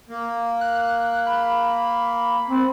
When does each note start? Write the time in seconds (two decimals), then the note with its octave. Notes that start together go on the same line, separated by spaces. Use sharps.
0.09 A#3
0.61 F#6
1.27 B5
2.50 C4